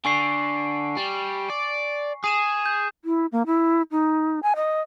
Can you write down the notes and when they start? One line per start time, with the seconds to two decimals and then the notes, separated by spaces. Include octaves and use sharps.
0.05 D3 G#5 C#6 C7
0.97 G3
1.50 D5
2.24 G#4 D#6 D#7 E7
2.66 G6
3.05 E4
3.32 A#3
3.46 E4
3.91 D#4
4.42 G#5
4.56 D#5